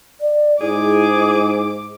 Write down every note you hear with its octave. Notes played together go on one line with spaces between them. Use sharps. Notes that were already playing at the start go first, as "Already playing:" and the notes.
D5
G#2 E4 G#4 D6